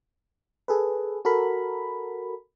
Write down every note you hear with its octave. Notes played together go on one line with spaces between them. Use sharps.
G#4 A4 B4
F#4 A4 A#4 B5